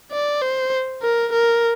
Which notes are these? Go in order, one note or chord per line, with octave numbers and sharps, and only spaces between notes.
D5
C5
A#4
A#4